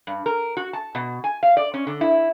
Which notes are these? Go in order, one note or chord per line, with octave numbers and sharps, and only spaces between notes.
G2
A#4
F#4
A5
B2
G#5
F5
D5
C#4
D3
E4